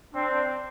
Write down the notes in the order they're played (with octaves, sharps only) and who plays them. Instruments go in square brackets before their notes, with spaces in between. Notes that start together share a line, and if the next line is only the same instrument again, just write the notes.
[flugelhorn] C4 [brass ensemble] D4